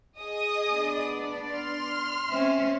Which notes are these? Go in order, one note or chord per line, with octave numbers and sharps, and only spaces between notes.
G#4 D#5 D#6
B3 D4 D5
C6 F6
C4 C#4 E5